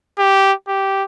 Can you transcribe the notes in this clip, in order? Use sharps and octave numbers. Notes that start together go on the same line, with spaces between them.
G4
G4